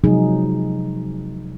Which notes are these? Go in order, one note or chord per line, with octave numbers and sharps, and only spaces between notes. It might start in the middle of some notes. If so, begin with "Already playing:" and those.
C3 F3 F#3 G#3 D#4 G#4